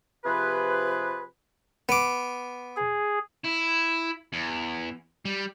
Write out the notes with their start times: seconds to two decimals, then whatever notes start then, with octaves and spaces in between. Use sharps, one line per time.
0.24 C3 F3 F4 G4 G#4 B4
1.89 B3 D6
2.76 G#4
3.44 E4
4.33 E2
5.25 G3